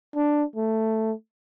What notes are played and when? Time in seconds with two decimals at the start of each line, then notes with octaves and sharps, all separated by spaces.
0.15 D4
0.56 A3